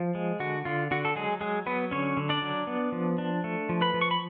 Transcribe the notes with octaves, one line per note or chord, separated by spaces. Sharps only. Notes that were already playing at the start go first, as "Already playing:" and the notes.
Already playing: F3
G#3
D3 F#4
D3 F4
D3 F#4
A4
F#3 G#3 G#4
F#3 G#3 G#4
F#3 B3 B4
D3 C#4 C#5
D3
D4 D5
F#3
B3
F3
D4
A3
F3
B4 B5
F3
C#6
B5